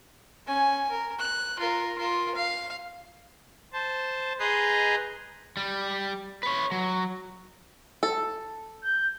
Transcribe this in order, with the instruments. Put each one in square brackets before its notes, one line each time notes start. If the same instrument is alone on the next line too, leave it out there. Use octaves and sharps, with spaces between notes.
[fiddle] C#4 G#5
A#4
F#6
F4 A#4
F4 A#4
F5
[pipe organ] C5 A5
G#4 B4 D#5 A#5 C6 G6
[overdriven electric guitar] G3
B4 C#5
F#3
[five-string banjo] A4
[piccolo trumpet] G6